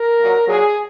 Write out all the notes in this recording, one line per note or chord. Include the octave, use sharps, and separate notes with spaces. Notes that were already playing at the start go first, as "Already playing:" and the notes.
Already playing: A#4
A#2 F#3
A#2 F#3 G#4